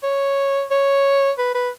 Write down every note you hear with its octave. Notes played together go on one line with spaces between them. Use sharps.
C#5
C#5
B4
B4